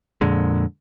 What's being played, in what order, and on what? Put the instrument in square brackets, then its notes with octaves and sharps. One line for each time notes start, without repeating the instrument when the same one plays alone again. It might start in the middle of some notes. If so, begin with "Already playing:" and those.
[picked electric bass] F2 A#2 D3 G#3